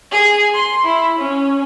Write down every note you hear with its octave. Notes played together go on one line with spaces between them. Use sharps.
G#4
C6
E4
C#4